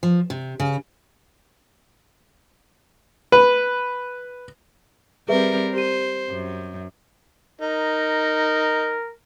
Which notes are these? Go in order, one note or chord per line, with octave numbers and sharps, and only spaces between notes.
F3
C3
C#3
B4
G3 C4 G#4 A#4 B4 E5
G4 C5 D#7
F#2
D#4 A#4